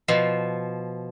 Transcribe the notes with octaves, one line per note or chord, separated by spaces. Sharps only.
B2 F3